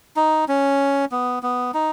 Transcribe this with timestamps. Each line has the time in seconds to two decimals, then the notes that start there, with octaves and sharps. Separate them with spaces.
0.16 D#4
0.48 C#4
1.12 B3
1.43 B3
1.74 D#4